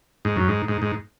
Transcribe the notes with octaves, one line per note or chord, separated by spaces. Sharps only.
G#2
F#2
G#2
G#2
G#2